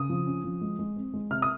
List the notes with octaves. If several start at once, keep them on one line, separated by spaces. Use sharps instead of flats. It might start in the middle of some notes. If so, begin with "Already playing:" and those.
Already playing: C#3 D#6
F3
C#4
F3
G#3
G#3
C4
G#3
C3 F6
D#6